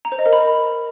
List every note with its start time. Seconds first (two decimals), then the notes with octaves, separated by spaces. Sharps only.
0.05 A#5
0.12 C5
0.19 D#5
0.26 A#4
0.33 B5